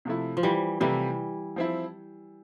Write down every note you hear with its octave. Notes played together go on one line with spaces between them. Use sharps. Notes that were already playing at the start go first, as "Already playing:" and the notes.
C3 F3 A3 E4
F3
E3 G3
C3 E3 F3 G3 A3 E4
F3 C4 E4